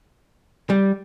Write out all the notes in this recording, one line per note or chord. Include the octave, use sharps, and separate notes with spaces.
G3